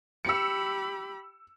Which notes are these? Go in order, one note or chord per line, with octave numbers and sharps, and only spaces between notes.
G4 B5 E6 C#7